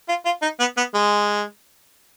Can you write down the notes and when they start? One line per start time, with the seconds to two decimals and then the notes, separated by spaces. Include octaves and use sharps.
0.08 F4
0.25 F4
0.42 D#4
0.60 B3
0.77 B3
0.95 G#3